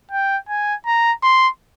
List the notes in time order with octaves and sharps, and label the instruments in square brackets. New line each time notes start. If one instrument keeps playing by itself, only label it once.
[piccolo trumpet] G5
G#5
A#5
C6